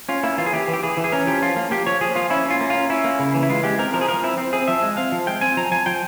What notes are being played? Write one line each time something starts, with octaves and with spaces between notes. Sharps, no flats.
C#4 F4
A#3 E4
E3 F4
G#4
E3 G4
E3
G4
E3 G#4
E3
G#4
C#4 A#4
F3 G4
F3 F4
A#3
A#3 G4
F3 C#5
F3 G#4
A#3 F4
C#4 E4
C#4 F4
A#3
F4
C#4
C#4 E4
A#3
C#3
E3
E4
G#3 F4
G#3 G4
C4 A#4
F3 A#4
G#4
F3 A#4
C4 E4
C4
C4 G#4
F3 E5
G#3
C4 F5
F3
G#3 G5
C4 G#5
F3 A#5
F3 G#5
F3 G5